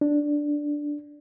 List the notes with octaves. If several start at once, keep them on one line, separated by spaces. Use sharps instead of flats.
D4